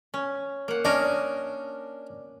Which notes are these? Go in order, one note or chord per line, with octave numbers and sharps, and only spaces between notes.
C#4
A#3 F#5
C#4 D4 A#4 D#5